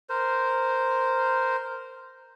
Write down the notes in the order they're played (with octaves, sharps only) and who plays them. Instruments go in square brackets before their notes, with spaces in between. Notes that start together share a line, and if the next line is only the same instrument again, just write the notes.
[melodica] A#4 C5